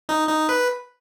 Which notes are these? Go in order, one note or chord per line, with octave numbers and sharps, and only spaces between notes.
D#4
D#4
B4